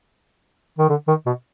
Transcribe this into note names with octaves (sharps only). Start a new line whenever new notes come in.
D#3
D3
D#3
B2